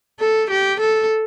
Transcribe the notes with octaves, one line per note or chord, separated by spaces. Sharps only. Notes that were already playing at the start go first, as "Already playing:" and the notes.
A4
G4
A4